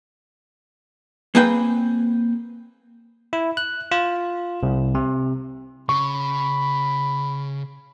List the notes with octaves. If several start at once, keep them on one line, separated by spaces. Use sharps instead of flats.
A#3 C4 G#4 B4 G5
E4
F#6
F4
C2
C3
C#3 B5 C#6